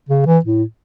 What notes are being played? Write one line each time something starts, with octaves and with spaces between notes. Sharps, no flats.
C#3
E3
A2